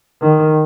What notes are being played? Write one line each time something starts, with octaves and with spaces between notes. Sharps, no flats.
D#3